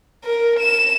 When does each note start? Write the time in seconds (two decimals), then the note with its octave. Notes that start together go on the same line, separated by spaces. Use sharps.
0.24 A#4
0.59 E7